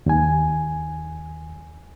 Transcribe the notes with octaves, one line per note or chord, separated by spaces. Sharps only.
D#2 G#5